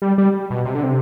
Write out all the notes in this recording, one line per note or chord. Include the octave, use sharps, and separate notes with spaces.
G3
G3
B2
C3
D3
C3